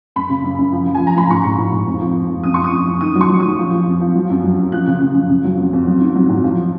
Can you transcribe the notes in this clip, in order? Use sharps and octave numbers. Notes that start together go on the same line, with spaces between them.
F#2 B5
C#3
F#2
F#2
F3
F3
G#5
F3
A#5
F3 B5
G#2 C#6
G#2
G#2
G#2
F2
F3
F2
F2
F#2 D#6
F3 C#6
D#6
F3
F#2
D#3 D#6
F#3
C#6
F#3
D#3 D#6
F3
F3
F2
F3
F#3
F#2
F#3
F#2
F3 F#6
C#3
C#3
F#2
C#3
F#3
F2
F2
F#3
D#3
F#3
G#2
F3